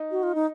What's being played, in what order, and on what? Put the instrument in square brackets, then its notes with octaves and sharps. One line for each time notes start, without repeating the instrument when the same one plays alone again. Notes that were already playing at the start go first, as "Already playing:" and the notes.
Already playing: [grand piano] D#4
[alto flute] F#4
F4
D#4